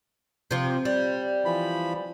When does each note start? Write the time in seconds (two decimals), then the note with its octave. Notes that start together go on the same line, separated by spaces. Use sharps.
0.51 C3 F3
0.85 G3
1.45 E3 F3 B5